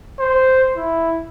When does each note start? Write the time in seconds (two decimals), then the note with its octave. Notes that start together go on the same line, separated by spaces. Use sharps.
0.19 C5
0.76 E4